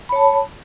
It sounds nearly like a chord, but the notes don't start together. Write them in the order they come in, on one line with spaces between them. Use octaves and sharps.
B5 C#5 A5